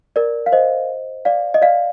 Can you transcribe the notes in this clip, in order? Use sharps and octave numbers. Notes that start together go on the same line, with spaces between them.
A#4 D5
F5
C5 D#5
D5 F5
D#5
D5 F5